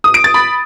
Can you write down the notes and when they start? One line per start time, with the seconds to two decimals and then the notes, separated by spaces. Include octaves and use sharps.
0.04 D#6
0.14 D7
0.24 A6
0.34 B5